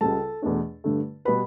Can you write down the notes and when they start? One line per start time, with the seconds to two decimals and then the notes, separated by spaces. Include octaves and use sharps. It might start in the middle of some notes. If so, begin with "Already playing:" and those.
0.01 C#2 C#3 G3 A4 A5
0.42 E2 B2 A3 D4
0.84 G2 D3 A3
1.25 B2 G3 B4 B5